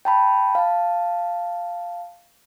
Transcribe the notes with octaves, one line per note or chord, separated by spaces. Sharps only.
G5 A5 B5
F5 A5